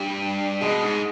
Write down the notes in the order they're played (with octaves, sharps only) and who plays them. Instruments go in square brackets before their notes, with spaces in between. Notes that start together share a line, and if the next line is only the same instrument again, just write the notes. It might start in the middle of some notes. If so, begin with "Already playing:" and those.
Already playing: [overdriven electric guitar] G2 [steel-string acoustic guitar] G3
[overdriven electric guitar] B2 [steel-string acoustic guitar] G#3
[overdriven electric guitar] G#2